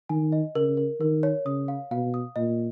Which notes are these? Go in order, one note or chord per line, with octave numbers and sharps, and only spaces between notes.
D#3 G#5
D#5
C#3 A#4
A#4
D#3 A#4
C#5
C#3 D#6
F5
B2 F5
D#6
A#2 D#5